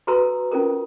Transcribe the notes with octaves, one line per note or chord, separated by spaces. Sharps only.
F#4 A4 B4 A#5 C6 E6
C#4 F4 A4 A#4